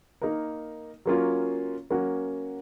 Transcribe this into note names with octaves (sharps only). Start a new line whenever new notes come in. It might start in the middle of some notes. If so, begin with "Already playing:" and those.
A#3 D#4 A#4
F#3 A#3 C#4 F4
F#3 A#3 C#4 F#4